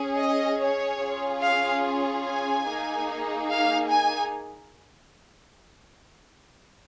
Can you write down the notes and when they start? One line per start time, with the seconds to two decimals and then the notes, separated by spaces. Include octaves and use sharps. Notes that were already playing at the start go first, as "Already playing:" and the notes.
Already playing: C#4 G#4
0.19 D#5
0.60 C#5
1.01 C#4 F4 G#4
1.42 F5
2.25 G#5
2.66 A#3 D#4 G#4
3.49 F5
3.90 G#5